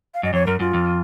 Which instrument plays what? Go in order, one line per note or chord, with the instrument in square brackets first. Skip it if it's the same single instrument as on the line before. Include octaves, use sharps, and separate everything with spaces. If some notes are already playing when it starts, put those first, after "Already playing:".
[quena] F5
[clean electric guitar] F#2 [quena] D#5
[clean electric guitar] F2 [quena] C#5
[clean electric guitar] F#2 [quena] A#4
[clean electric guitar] F#2 [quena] F4
[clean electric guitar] F2